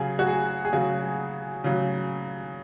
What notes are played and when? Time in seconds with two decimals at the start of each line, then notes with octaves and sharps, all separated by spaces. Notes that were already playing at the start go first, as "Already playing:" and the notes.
Already playing: C#3 F#3 G#4
0.19 F#4
0.27 G#4
0.65 G#4
0.73 C#3 F#3 F#4
1.64 C#3 F#3